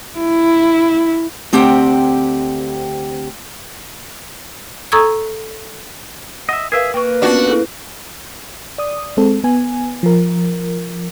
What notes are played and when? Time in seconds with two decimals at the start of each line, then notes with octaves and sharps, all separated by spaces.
0.18 E4
1.53 D2 C4 G4 F#5 G5
4.92 A4 A#5 C#6 D#6 E6 G#6
6.49 D#5 E5 F#5
6.72 G#4 A#4 B4 E5 F5
6.94 A#3 B4 G5 C#6
7.22 B3 C#4 D4 F4 F#4
7.48 E4 G#4 A4
8.78 D5 D#6
9.17 G#3 C4 A4
9.44 B3 G#5
10.03 F3 A#4